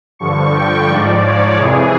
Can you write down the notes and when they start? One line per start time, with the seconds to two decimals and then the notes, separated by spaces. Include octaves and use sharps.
0.19 G2 D3 F3 C#6
0.54 G5
0.88 G#2 F3 D5
1.23 C#5
1.57 F2 C3 E3 G#4